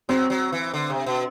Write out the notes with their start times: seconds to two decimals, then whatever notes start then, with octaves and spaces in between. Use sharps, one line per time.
0.09 F#3 C4
0.30 F#3
0.52 E3
0.74 D3
0.90 C3
1.06 B2